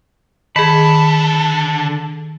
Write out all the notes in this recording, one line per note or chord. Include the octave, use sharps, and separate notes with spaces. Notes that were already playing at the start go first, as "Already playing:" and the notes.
D3 D#3 G#4 A5 B5